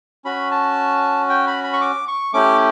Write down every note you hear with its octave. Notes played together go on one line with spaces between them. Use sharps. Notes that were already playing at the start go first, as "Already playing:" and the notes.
C#4 F#4 B5
A5
G5
B5
B5
C#6
D6
C#6
A3 C#4 E4 G4 D6